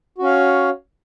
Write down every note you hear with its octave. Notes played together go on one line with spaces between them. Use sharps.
C#4 F#4 C#5 F5